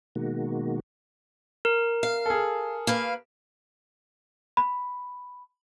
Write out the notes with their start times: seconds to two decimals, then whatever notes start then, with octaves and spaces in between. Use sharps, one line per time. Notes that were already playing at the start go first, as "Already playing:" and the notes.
0.16 B2 D#3 G#3 A#3 F#4
1.65 A#4
2.03 F5
2.26 G#4 A4
2.87 A#3 B4 F5
4.57 B5